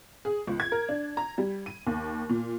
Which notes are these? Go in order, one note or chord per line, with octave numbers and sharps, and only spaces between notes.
G#4
C#2
G#6
A#4
D4
A#5
G3
D#7
D#2
A#2